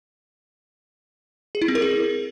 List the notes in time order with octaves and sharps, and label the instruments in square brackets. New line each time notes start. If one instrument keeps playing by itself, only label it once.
[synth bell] G#4
E4
C4
A#4
G#4